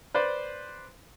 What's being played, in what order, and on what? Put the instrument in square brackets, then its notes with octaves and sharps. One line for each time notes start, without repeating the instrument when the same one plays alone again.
[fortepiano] B4 C5 D5